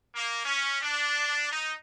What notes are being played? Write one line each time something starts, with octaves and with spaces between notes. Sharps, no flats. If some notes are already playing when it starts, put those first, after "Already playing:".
A#3
C#4
D4
D#4